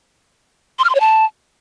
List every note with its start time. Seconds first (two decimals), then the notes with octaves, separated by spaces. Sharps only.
0.79 C6
0.84 F6
0.90 C6
0.95 C#5
1.00 A5